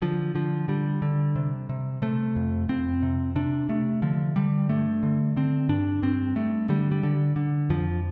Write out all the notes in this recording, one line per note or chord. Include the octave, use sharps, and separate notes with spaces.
D3 F3
D3 F3
D3 G3
D3
C3
C3
C3 A3
F2
F2 C4
C3
C3 D4
C3 A3
D3 F3
D3 G3
G2 A3
D3
D3 C4
G2 D4
G2 C4
G2 A3
D3 G3
G3
D3
D3
F2 F3